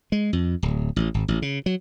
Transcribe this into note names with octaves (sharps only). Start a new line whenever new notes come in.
G#3
F2
D1
A1
G#1
A1
C#3
F#3